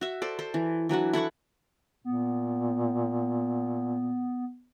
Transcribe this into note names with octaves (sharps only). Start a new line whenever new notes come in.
F#4 E5
A4 C5 D5
A4 C5
E3
E3 F#3 D4 F#4
E4 A4 F#5 C#6
A#2 B3